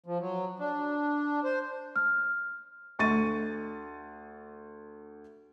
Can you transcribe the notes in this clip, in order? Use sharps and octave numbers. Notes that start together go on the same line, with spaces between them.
F3
F#3
D4
C5
F6
D2 C#6 A6 D#7